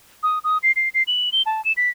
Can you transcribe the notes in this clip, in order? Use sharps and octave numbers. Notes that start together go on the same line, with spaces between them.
D#6
D#6
C7
C7
C7
F#7
G7
A5
E7
B6